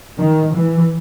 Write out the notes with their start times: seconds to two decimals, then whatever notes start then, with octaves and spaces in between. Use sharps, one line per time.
0.17 D#3
0.54 E3